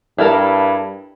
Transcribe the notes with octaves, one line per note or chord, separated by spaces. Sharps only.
G2 E4 A4 A#4